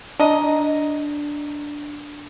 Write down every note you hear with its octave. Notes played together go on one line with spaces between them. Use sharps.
D4 D#5 A#5